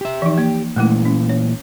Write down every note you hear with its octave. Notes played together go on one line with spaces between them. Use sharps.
G4 E5
E3 F3 D#4
A#3 G4
A#2 E3 G#3 A3 E4
C#4
C#5